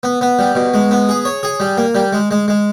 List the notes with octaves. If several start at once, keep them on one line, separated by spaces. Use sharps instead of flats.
B3
B3
G3
B2
G#3
B3
G#4
C#5
G#4
G3
A#3
G3
G#3
G#3
G#3